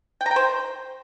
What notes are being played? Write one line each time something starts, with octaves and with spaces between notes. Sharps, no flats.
G5
A#5
G5
C5